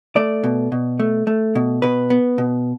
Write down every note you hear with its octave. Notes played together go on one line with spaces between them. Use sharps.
A3 D5
B2
B2
A3
A3
B2
B2 B4
B3
B2